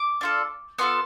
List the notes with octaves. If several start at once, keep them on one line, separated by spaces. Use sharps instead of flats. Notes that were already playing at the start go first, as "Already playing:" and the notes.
Already playing: D6
D4 F4 A4
B3 F4 A4 C6